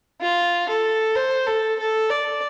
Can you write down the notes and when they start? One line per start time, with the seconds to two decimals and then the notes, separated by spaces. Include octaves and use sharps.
0.21 F4
0.68 A4
1.15 C5
1.47 A4
1.79 A4
2.10 D5